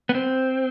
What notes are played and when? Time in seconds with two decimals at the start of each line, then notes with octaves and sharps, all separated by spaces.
0.09 B3
0.15 C4